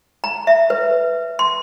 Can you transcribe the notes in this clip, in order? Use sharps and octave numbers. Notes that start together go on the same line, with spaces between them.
A#5
E5
B4
C6